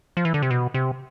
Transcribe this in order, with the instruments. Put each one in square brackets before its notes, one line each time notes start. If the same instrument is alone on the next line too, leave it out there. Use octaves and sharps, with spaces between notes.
[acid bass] F3
E3
D3
C3
B2
C3